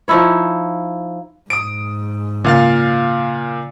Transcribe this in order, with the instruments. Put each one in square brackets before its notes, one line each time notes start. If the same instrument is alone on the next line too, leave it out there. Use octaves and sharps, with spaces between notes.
[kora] F3 D#4 E4 C#5
[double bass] G#2 [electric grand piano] D#6 D7
[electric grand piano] A#2 F5 A6 [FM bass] C#3